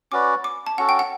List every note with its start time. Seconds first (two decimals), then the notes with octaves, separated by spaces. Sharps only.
0.12 C#4 F#4 B4 D5 D6
0.44 D6
0.67 A5
0.78 C#4 F#4 A4 F#5
0.89 G5
0.99 F#5